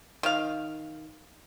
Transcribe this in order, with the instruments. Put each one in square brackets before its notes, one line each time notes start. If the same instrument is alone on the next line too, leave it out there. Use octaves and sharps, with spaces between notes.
[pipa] D#3 F5